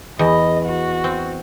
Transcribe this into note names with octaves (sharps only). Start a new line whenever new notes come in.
E2 D#5
F#4
C4